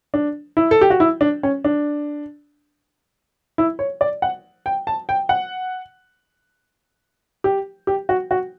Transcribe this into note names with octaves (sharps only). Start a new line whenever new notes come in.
D4
E4
A4
G4
F#4
E4
D4
C#4
D4
E4
C#5
D5
F#5
G5
A5
G5
F#5
G4
G4
F#4
F#4